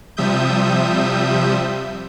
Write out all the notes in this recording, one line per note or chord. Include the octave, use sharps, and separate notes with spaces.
C3 F3 G3 E5 D#6 G6